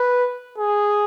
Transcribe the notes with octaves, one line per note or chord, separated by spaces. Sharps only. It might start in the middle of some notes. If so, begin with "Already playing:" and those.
Already playing: B4
G#4